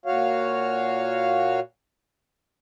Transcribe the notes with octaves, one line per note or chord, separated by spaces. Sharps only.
A#2 F#4 C#5 F5